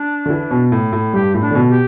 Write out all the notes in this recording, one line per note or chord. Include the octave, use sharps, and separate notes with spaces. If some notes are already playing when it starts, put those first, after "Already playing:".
Already playing: D4
D3
E3
B2
A2
A2
G2 G4
A2
D4
D3
B2
G4